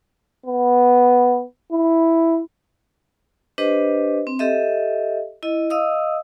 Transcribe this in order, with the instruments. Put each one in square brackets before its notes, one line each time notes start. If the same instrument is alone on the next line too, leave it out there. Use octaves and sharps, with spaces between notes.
[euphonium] B3
E4
[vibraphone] D4 G4 B4 C5 D#5
C4
G4 A4 D#5 E5
E4 D#5
D#5 F5 D#6 E6